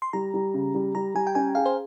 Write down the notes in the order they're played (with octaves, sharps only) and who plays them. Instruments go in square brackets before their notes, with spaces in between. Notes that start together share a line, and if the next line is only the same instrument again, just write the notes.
[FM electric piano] C6
[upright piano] G3 [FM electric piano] A#5
[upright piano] G3
C#3
G3
[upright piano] G3 [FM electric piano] A#5
[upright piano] G3 [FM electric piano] G#5
[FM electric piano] G5
[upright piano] C#4 [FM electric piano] G#5
[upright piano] G#4 [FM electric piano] F5
[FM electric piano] C5